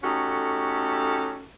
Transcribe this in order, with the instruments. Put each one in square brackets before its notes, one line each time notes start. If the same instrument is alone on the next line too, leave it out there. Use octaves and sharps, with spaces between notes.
[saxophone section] A3 C#4 D#4 F#4 G4 A4